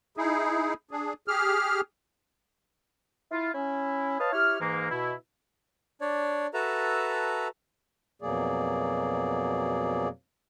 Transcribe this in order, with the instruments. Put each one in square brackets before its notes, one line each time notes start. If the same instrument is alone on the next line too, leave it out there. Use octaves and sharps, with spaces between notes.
[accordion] D#4 E4 G#4
D4 G#4
G4 G#4 F6
[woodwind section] E4 F4
C#4 E4
B4 C#5 D#5 F5 A5
E4 G4 C#5 F6
G#2 E3 G#3 A#3
B2 E4
[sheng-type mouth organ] D4 C#5 D5
F#4 A4 B4 E5 A5 A#5
[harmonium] F2 B2 F#3 A#3 G#4 D5